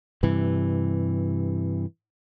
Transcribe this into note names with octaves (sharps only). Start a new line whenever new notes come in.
G2 C3 E3